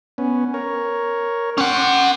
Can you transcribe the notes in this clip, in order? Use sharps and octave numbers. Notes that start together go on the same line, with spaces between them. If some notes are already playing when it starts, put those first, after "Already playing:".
B3 C#4
A#4 C#5
C#4 F#5 G5 C6 D6